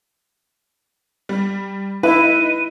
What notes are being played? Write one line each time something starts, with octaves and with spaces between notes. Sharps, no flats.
G3
D#4 E4 B4 D#7